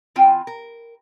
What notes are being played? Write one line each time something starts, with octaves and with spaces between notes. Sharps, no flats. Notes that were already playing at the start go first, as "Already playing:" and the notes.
E3 C4 F4 G5 G#5
A#4